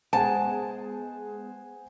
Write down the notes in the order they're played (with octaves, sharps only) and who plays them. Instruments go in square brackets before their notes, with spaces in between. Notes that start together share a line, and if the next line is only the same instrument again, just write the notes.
[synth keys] G#3 B3 G#4 [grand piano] C5 F#5 G#5 [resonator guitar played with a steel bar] A5